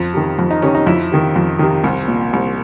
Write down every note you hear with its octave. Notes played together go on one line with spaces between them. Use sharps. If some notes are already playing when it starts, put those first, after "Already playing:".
Already playing: F2
C3 D#3
F2
D#4
C3 D#3 C#4
D#4
F2 E4
C3 D#3
F2
C3 D#3
C2
A#2
C2